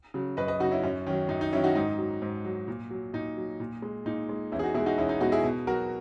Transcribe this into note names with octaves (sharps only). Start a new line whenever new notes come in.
C#3 F#3
F#2 B4 D#5
B4 D#5
C#3 F#3 D#4 F#4
C#4 E4
F#2 C#4
D#3 F#3 C#4
F#2 D#4
D#4
D#3 F#3 C#4 E4
D#4 F#4
G#2 D#4
F#3
G#2
F#3
A#2
F#3
A#2 D#4
F#3
A#2
G#3
A#2 D#4
G#3
E2 C#4 E4
G#4
D#4 F#4
B2 G#3 E4 G#4
D#4 F#4
E2 C#4 E4
D#4
B2 G#3 D#4 F#4
E4 G#4
B2
F#3 F#4 A#4